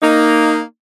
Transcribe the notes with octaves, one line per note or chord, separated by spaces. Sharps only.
A#3 D#4